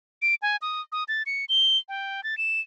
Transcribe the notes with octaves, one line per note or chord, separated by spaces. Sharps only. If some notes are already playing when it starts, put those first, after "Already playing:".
D7
G#5
D#6
D#6
A6
C#7
G7
G5
A6
E7